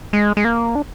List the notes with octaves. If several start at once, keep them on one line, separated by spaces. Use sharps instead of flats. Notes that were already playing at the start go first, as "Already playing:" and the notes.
G#3
G#3
A#3
D4